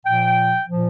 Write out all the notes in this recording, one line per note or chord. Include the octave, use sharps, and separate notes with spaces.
A#2 F3 G5
A#2 F3